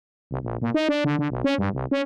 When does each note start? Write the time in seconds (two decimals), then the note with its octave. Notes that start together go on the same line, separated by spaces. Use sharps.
0.31 C2
0.43 A#1
0.62 A#2
0.74 D#4
0.89 D4
1.04 D3
1.19 D3
1.30 B1
1.44 C#4
1.58 G2
1.73 C2
1.91 C#4